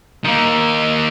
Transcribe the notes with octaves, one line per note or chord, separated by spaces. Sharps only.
D#3 A#3